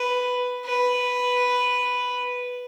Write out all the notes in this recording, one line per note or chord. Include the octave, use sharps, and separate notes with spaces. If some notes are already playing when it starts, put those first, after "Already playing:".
Already playing: B4
B4